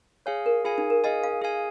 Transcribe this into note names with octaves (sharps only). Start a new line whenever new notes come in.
G#4 C#5 F5 G#5
A#4
F4 G#4 F5 G#5
D#4
A#4
G#4 D#5 F5 G#5
F5
G#4 F5 G#5